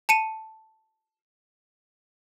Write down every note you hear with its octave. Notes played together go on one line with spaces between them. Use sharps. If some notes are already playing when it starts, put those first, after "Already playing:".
A5 C#7 D#7